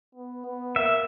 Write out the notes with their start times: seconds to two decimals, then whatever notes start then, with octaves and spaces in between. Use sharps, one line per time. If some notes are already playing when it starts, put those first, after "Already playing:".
0.15 B3
0.46 B3
0.76 A#3 E5